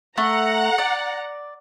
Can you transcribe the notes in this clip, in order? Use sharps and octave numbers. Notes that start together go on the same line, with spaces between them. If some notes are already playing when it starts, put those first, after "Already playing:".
A3 F#5 A#5
D5